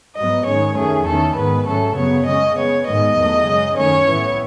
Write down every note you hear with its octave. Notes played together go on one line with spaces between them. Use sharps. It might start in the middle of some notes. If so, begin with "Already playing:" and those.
G#2 F#3 B3 D#5
G#2 D#3 G#3 C#4 C#5
F#2 D#3 A3 C#4 G#4
E2 D#3 A3 C#4 A4
G#2 D#3 G#3 B3 B4
G#2 F#3 A3 C#4 A4
F#2 C#3 F#3 B3 C#5
C#3 G#3 C#4 D#5
C#3 G#3 B3 C#5
G#2 D#3 G#3 D#5
E2 D#3 F#3 A3
F#2 C#3 G#3
F#2 D#3 A3 C#4 C#5
A2 E3 B3